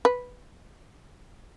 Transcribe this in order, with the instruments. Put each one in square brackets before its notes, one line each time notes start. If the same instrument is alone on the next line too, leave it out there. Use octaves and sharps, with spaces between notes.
[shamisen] B4